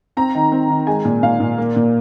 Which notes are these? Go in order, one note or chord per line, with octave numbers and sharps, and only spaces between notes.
C4 A#5
D#3
C4
D#3
G#3 G#5
A#2
A#2 F5
A#2
A#3
A#2